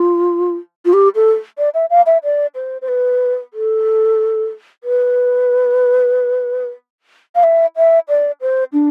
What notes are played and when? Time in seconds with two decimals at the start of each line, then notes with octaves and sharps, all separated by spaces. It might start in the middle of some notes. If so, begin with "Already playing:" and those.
Already playing: F4
0.85 F4
0.93 G4
1.15 A4
1.58 D5
1.74 E5
1.90 F5
2.06 E5
2.24 D5
2.55 C5
2.82 C5
2.88 B4
3.54 A4
4.84 B4
7.35 F5
7.43 E5
7.76 E5
8.09 D5
8.41 C5
8.73 D4